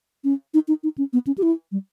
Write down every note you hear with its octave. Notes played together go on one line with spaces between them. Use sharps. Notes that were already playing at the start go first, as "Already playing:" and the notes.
C#4
D#4
D#4
D#4
C#4
B3
C#4
G4
E4
G3